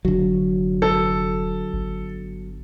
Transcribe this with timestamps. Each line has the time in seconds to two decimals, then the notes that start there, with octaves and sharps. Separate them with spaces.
0.05 F1 D3 F#3
0.82 A4
1.73 G1